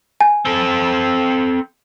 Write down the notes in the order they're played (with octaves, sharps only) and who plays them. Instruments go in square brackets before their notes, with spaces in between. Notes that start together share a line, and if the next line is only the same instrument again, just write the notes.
[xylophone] G#5
[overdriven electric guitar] C4 A4